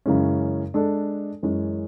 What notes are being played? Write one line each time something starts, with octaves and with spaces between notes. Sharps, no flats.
F#2 C#3 E3 G#3 C#4
G#3 D4 A4
F#2 E3 G#3 C#4